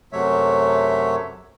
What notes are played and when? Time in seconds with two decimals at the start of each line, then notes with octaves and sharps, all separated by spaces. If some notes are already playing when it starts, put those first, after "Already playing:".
0.13 F#2 C3 F#3 A3 C#5 E5